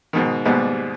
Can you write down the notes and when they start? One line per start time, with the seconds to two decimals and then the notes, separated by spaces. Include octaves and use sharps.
0.13 G#2 B2 D#3
0.45 D#2 G#2 B2 G3 B3